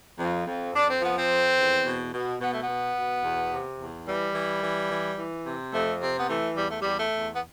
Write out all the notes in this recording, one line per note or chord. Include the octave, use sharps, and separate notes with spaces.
F2
F2
F2 D4
C4
F3 B3
C4
F2
E2
B2
B2
B2 B3
A3
B3
B2
B2
E2
C3
E2
E3 G3
E3
E3
E3
E3
C3
F2 A3
C3 C4
B3
E3 A3
E2 G3
A3
E2 G3
A3
E2
B3